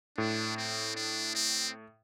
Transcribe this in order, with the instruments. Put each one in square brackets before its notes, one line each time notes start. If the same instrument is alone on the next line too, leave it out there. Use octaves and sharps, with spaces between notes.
[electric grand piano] A2 [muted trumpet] D4
[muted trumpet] C4
D4
C4